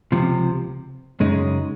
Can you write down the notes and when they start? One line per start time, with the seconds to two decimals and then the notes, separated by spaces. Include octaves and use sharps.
0.12 C#2 C3 F3
1.20 F#2 C#3 G#3 D#4